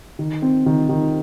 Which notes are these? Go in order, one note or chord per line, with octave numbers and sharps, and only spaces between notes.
D#3
C4
D#3
D#3